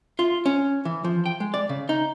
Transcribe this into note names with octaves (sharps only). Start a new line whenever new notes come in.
F4
C#4
E3
F3
G5
G#3
D5
C#3
D#4